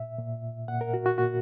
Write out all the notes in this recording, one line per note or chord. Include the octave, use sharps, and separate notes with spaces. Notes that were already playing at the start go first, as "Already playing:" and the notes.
Already playing: A#2 E5
A#2
A#2 F#5
A#4
F#4
F#4
A#2 F#4